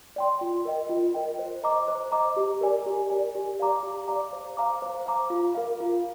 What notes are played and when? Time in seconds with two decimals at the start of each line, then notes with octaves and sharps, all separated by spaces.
0.16 D5 G5 C6
0.41 F4
0.65 A#4 D#5 G5
0.90 F4
1.14 A#4 D#5 G5
1.39 C5
1.64 D#5 A#5 D6
1.88 C5
2.12 D#5 A#5 D6
2.36 G4
2.61 A#4 D5 G#5
2.86 G4
3.10 A#4 D5 G#5
3.35 G4
3.59 D5 F5 A#5 D6
3.83 G4
4.08 D5 F5 A#5 D6
4.33 C5
4.57 F5 A#5 D6
4.82 C5
5.06 F5 A#5 D6
5.30 F4
5.55 A#4 F5
5.80 F4